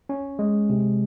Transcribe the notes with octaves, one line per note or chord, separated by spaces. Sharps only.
C#4
G#3
C3